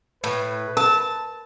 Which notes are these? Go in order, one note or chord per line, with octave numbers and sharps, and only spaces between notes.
A2 B4
A#4 A5